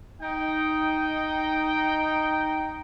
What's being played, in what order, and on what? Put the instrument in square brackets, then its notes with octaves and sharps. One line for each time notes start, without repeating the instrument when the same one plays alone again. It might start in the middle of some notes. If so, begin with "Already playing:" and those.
[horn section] D#4 G5